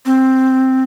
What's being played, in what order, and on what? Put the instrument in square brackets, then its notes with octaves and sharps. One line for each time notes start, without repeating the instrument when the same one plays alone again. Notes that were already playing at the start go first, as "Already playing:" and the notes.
[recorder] C4